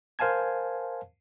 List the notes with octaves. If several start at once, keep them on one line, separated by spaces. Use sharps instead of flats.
A#4 C5 F5 G#5 A5 G#6